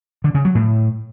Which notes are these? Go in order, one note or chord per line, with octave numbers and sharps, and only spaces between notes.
D3
C#3
F#3
A2